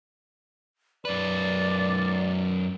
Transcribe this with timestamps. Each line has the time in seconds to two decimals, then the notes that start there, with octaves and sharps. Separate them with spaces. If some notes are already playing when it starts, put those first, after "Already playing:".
1.05 F#2 B4 D5